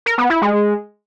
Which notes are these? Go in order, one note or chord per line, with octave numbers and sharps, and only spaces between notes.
A#4
B3
E4
G#3